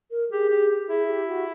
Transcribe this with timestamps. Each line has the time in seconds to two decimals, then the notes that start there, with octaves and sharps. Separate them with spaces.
0.11 A#4
0.30 G4 G#4
0.50 G4
0.88 E4 G#4
1.08 G4
1.28 F#4